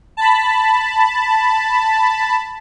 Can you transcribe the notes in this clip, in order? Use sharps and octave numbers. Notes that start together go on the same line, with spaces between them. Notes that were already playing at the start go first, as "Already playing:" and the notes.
A5 B5